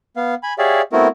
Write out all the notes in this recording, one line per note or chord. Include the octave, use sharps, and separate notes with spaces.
B3 F5
G#5 B5
G4 G#4 C#5 D5 E5 F5
A3 B3 C4 E4 F#4 A#4